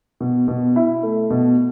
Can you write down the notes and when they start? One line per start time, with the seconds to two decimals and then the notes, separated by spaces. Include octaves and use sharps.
0.21 B2
0.48 B2
0.76 E4
1.03 A3
1.30 B2